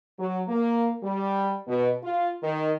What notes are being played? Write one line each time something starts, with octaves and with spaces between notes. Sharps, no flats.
F#3
A#3
G3
B2
F4
D#3